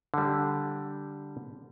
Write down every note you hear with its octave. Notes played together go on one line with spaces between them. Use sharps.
D3 G3